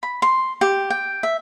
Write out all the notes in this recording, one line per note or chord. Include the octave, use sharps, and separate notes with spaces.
B5
C6
G4
G5
E5